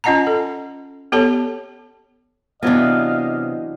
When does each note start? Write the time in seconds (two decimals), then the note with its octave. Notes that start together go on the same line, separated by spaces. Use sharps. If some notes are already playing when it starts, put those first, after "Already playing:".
0.04 C#4 F4 D#5 F#5 A5 A#5
0.27 A4
1.12 B3 G4 A4 C#5 A5
2.63 C3 E3 F#3 B3 D4 D#5 F5